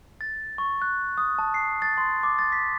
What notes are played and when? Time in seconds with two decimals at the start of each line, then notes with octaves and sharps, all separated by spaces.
0.21 A6
0.58 C#6
0.82 F#6
1.18 D#6
1.38 A5
1.54 C7
1.82 A6
1.98 C6
2.23 D6
2.39 A6
2.52 B6